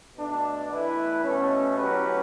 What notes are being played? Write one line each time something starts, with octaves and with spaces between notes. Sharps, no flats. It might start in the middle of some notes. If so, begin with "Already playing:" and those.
B2 A3 D4
E3 A3 E4 B4
B2 A3 C#4
A2 F#3 C#4 G4 B4